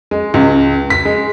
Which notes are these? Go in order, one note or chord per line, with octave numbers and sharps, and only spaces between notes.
G#3
C#2
B6
G#3